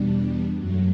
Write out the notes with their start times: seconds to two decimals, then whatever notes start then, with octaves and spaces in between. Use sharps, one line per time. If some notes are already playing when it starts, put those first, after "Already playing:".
Already playing: E2 B2 G3 D4
0.57 F#2 F#3 A3